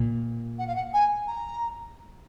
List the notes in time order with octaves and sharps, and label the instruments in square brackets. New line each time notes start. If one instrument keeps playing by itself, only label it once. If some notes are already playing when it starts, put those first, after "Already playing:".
Already playing: [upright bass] A#2
[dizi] F#5
F5
F#5
G#5
A#5